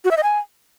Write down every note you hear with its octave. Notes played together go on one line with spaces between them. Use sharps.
F#4
E5
D#5
G#5